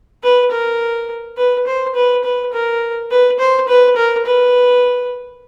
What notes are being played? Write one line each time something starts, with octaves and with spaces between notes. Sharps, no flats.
B4
A#4
B4
C5
B4
B4
A#4
B4
C5
B4
A#4
B4